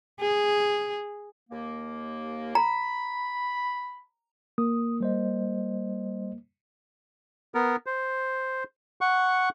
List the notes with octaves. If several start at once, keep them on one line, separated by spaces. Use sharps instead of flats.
G#4
D#2 A#3
A#5 B5
A#3 D#6
G3 C5 D#5
B3 A#4
C5
F#5 C#6